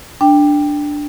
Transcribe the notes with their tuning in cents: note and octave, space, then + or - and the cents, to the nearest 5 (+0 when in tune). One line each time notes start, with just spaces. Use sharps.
D4 +0 G5 +10